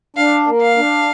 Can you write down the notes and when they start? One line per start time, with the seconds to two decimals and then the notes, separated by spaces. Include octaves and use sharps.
0.16 D4 F5
0.47 A#3
0.62 F5
0.77 D4